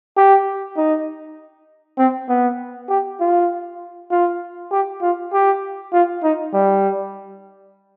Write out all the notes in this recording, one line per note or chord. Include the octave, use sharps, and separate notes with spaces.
G4
D#4
C4
B3
G4
F4
F4
G4
F4
G4
F4
D#4
G3